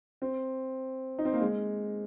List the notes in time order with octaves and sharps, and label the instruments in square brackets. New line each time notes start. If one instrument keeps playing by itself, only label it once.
[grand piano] C4
D#4
C4
A#3
G#3